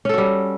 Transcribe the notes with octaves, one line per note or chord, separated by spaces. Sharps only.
G3 C#4 F#4 A4